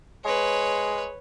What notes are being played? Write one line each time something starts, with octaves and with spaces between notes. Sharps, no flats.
G#3 B4 C#5